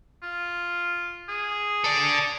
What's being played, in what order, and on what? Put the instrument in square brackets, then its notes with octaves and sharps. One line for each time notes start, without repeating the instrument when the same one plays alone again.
[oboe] F4
G#4
[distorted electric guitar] A4 D5